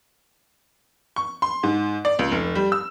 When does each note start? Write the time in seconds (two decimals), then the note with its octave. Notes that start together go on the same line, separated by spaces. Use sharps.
1.16 C#6
1.42 C6
1.63 G#2
2.05 D5
2.19 C#2
2.32 F1
2.55 G3
2.72 E6